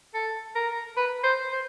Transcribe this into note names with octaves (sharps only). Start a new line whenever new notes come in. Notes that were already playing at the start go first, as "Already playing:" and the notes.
A4
A#4
B4
C5
C5